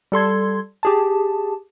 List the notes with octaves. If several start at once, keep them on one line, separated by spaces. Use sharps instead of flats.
G3 A4 C6 G#6
G4 G#4 A5